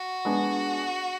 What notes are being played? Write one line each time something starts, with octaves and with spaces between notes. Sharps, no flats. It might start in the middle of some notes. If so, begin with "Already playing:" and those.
Already playing: F#4
G#3 B3 D4